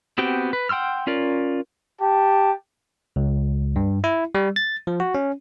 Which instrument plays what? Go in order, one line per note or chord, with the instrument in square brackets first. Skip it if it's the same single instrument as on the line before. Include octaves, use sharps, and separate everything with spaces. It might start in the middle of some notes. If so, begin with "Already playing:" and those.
[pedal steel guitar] B3 C4 F#4 G4 G5
B4
F#5 G5 C6 E6 F6
C#4 F4 A#4 D5
[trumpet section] G4 A5
[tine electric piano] C#2
G2
E4
G3
A6
F3
F#4
C#4